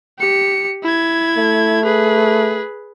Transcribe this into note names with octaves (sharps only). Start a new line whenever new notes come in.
G4 C#7
E4 G#6
A3
G#4 B4